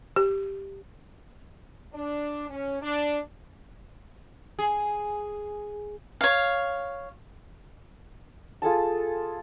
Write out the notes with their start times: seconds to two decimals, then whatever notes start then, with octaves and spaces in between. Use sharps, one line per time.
0.16 G4
1.94 D4
2.49 C#4
2.82 D4
4.59 G#4
6.21 C#5 F5
8.62 F4 G#4 A4 A5